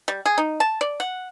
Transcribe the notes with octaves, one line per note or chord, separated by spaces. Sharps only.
G3
G#4
D#4
A5
D5
F#5